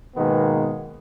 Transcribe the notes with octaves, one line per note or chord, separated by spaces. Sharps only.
G#2 B2 D#3 G#3 A#3 B3